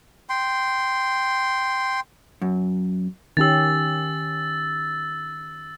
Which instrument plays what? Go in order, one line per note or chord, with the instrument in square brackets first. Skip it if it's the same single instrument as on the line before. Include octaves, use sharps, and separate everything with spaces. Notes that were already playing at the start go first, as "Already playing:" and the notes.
[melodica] G5 C6
[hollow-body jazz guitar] F#2
[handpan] D#3 C#4 G4 [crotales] E6 A6